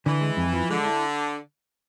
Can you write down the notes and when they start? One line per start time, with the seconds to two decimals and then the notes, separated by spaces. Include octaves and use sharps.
0.06 D3 E3
0.21 G#3
0.37 F2
0.53 F3
0.70 D3 G#3
0.85 E4